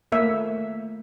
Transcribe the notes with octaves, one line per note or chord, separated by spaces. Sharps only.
A3 A#3 E5